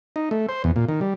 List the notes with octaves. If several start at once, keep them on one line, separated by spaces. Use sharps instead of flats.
D#4
A3
C5
E2
A#2
D#3
G3